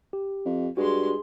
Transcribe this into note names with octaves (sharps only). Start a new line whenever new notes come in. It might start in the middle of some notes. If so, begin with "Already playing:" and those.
G4
F2
G2 G#3 F#4 C6